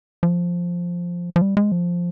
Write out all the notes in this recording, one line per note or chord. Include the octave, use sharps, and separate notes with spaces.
F3
F3
G3
G#3
F3